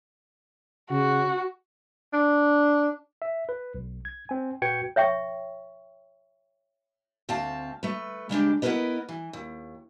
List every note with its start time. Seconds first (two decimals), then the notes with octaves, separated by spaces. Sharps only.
0.91 C#3 F#4
2.14 D4
3.22 E5
3.49 B4
3.74 B1
4.05 G#6
4.29 C4 G#5
4.62 A#2 F#4 B4 G5 G#6 C#7
4.96 C#5 E5 G5 C#6
7.29 D2 C4 E5 F5 A5
7.83 A3 B4
8.29 C#3 G#3 D4 G4
8.62 B3 E4 F4 A#4 B4 D#5
9.09 E3
9.33 D#2